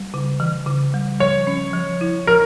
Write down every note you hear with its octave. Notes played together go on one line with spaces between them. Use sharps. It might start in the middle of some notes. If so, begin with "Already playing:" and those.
Already playing: G3
C#3
E3
C#3
G3
F3 C#5
C#4
F3
E4
F3 A#4